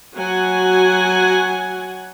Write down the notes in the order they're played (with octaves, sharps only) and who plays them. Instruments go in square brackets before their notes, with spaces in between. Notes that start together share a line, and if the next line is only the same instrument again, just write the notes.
[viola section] F#3 F#4 F#5 G#5